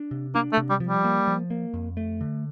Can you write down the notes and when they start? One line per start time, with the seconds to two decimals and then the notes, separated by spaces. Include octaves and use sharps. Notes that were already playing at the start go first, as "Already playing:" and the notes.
Already playing: D4
0.11 C3
0.35 A#3 D4
0.53 A3
0.57 C3
0.70 G3
0.80 F3
0.87 G3
1.04 A#3
1.27 F3
1.50 A#3
1.74 F2
1.97 A3
2.21 D3